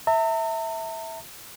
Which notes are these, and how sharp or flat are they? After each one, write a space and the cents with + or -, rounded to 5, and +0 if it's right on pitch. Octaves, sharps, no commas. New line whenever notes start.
E5 -10 A#5 -45